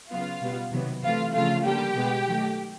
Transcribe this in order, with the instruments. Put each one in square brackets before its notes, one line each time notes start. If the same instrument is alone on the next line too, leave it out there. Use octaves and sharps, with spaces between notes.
[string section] C#3 F#3 B3 F4 F5
B2 G3 B3
C3 D#3 F#3 B3
C3 E3 A3 F4 F5
C#3 F3 A3 F4 F5
D3 G3 A#3 G4 G5
B2 G#3 B3
D#3 F#3 A3